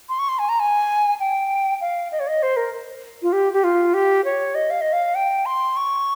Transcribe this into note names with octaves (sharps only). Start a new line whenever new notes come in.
C6
C#6
C6
G#5
A#5
G#5
G5
F5
D#5
C#5
D#5
C5
A#4
F4
G4
G4
F4
G4
C#5
D#5
F5
D#5
F5
G5
C6
C#6